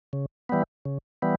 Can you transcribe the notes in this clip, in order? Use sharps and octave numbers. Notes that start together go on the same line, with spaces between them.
C#3
E3 G3 B3
C#3
E3 G3 B3